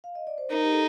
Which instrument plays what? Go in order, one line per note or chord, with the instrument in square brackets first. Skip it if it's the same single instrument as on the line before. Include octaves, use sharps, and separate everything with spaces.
[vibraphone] F5
D#5
D5
C5
[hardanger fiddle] D#4 [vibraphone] A#4
[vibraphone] G4
A4